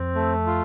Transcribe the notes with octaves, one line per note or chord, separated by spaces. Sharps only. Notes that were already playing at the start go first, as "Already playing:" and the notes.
Already playing: F2 C4
A3
F4